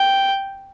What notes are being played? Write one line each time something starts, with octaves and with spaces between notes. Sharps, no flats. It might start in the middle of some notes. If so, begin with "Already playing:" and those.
Already playing: G5